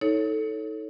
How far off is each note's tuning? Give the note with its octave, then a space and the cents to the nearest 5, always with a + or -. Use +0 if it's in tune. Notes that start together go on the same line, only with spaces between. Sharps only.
D#4 +30 A4 +0 C#5 +0